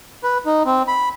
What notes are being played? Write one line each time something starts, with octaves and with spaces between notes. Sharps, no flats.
B4
D#4
C4
B5